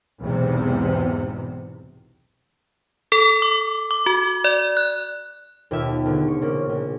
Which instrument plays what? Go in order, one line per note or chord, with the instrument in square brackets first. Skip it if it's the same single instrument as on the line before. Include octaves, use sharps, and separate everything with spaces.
[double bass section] B1 E2 G#2 C3
[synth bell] A4
D6
D6
F#4
D5
F#6
[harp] D#2 B2 F4 G4 E5
A#1 D3
C#6
C#3 A#3 C#4
A#1